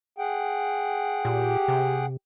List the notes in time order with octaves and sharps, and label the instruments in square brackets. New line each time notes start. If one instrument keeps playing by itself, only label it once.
[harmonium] G#4 F#5 G5
[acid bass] A#2 [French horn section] G4
[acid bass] C3